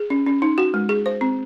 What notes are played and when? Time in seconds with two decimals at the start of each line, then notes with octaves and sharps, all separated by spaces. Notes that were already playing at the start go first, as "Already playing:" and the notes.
Already playing: G#4
0.10 C#4
0.26 C#4
0.42 D#4
0.58 F#4
0.74 G#3
0.89 G#4
1.06 C5
1.21 C4